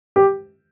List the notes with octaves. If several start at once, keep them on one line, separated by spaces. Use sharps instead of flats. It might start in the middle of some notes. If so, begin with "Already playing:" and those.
G4